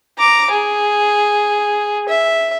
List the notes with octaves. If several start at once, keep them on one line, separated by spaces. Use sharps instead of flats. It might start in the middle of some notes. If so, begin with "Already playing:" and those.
A#5 D6
G#4
E5